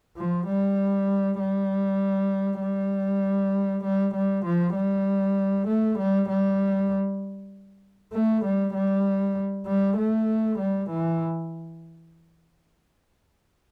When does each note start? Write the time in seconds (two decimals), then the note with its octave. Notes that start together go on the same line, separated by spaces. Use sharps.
0.17 F3
0.47 G3
1.40 G3
2.61 G3
3.84 G3
4.14 G3
4.45 F3
4.76 G3
5.68 A3
5.98 G3
6.29 G3
8.13 A3
8.44 G3
8.74 G3
9.67 G3
9.98 A3
10.58 G3
10.89 E3